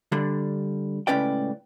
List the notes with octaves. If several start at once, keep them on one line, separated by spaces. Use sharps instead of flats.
D3 G3 D4
C#2 A2 C#4 B4 D5 G5